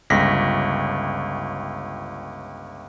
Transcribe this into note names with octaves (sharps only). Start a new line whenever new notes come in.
G1 C#2 A#6 B6